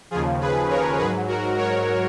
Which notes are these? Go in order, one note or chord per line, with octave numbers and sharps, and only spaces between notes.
D#2 C#3 F3 F4 G#4
G#4 B4
A#4 C#5
G#2 F#3 G#4 B4
F#4 A#4
A#4 C#5